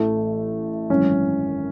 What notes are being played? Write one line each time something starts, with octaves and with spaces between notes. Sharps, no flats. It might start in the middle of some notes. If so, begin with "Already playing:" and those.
Already playing: A1 A2 E3 A3
G#1 F#2 E3 C#4